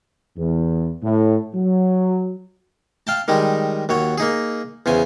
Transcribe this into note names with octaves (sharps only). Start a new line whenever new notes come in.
E2
A2
F#3
F5 G5 A5
D#3 G3 G#3 D#4
D#2 F#3 C#5
A#3 D#4 G#4
E2 C#3 C5 G#5